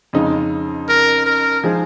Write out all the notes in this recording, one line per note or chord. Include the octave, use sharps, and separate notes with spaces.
F2 C#3 G#3 D#4
A#4
A#4
F3 G#3 D#4 G#4